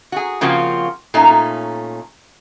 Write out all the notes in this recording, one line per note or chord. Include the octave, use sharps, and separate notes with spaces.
F#4 G#4
C#3 F3 A#3 C4 F4 F#4
A#2 A3 C#4 D#4